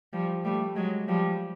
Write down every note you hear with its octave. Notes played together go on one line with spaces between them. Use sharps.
F3 G3
G3 A3
F#3 G#3
F3 G3